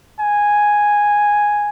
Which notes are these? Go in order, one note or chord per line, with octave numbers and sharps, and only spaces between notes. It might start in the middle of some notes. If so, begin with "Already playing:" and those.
G#5